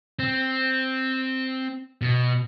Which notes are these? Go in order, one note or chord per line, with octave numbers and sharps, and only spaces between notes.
C4
B2